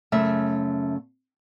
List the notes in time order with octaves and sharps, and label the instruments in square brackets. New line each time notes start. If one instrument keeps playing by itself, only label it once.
[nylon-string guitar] F#2 C#3 A3 E5